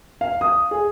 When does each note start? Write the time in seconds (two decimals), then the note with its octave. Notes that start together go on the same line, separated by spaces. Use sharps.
0.21 F5
0.41 D#6
0.71 G#4